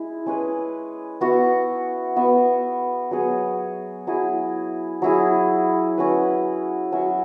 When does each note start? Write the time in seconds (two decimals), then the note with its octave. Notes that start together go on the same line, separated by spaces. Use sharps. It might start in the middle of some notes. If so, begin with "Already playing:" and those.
Already playing: G#3 E4
0.26 G#3 C#4 G#4 B4
1.21 B3 F#4 E5
2.16 B3 F#4 E5
3.11 F#3 B3 G#4 C#5
4.07 F#3 E4 G#4
5.02 F#3 E4 G#4
5.98 C#4 F#4 B4
6.92 F#3 C#4 F#4 E5